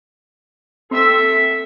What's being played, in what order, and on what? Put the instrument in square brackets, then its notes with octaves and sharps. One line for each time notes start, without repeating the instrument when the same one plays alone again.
[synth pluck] C4 E6 [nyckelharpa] A4 E5